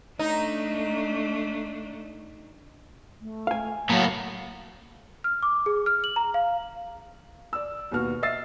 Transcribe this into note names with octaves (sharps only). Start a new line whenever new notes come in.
A3 D4 D#4
A3
F5 G#5
A2 F#3 A#3 B3
F6
D6
G#4
F6
F#7
A#5
F5
D5 E6
D#2 B2 B3 F#4 F6
D#5 E5 E6 A6 C7